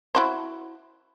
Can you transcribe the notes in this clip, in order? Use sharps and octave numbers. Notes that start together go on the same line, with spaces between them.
E4 F#4 C5